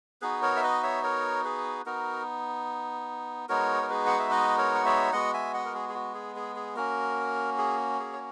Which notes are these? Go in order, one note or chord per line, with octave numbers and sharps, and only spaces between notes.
B3 D#4 F#4 G#4 B4
A#4 C#5
E5
B4 D#5
C#5 E5
A#4 C#5
G#4 B4
B3 D#4 F#4 A#4
G#3 B3 D#4 F#4 A#4 C#5
A#4
G#4 B4
F#5
E5
B4 D#5
A#4 C#5
F#5
C#5 E5
G#3 B3 F#4 D#5 F#5
E5 G#5
D#5 F#5
A#4
G#4
G#4
F#4
G#4
G#4
G#4
A#3 C#4 F#4 A#4
G#4
G#4
C#5